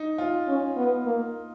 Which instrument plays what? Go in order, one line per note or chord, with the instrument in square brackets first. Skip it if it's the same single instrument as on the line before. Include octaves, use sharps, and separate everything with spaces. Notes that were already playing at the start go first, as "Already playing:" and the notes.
Already playing: [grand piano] D#4
F4
[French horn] C#4
B3
A#3